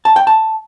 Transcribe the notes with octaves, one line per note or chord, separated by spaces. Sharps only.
A5
G5
A5